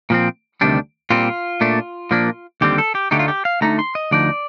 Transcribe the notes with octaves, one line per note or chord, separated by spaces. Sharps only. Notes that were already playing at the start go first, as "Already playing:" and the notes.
A#2 F3 C4
D2 C3 D#3 G3 D4
A#2 G3 C4 F4
A#2 A3 D4
A#2 F3 A#3 D4
D#2 D3 G3 C4 G4
A4
G4
D2 D3 A3 D#4 G4
F4
G4
F5
D2 D3 A3 D#4 A#5
C6
D#5
D2 D3 F3 D#4 D5